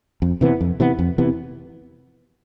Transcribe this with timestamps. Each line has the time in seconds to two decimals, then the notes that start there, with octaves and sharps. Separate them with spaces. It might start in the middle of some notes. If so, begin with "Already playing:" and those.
0.22 F2
0.41 C3 E3 B3
0.61 F2
0.80 C3 E3 B3
0.99 F2
1.18 C3 E3 B3